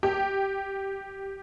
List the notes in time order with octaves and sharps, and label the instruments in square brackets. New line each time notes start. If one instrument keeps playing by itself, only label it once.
[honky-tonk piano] G4